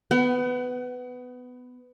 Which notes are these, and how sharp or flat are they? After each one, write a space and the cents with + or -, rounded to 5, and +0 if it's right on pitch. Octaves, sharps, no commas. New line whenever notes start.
B3 +15 F#5 +40